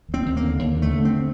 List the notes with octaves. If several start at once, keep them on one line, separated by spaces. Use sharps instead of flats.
D#2
C4
D#2
A#3
D3
D#2
D3
A3
D3
C4